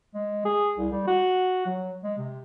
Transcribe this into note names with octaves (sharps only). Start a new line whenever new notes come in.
G#3
G#4
C2
G3
F#4
F#3
G#3
C3